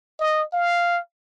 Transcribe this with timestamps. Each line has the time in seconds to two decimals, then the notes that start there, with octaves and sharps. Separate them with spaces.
0.20 D#5
0.53 F5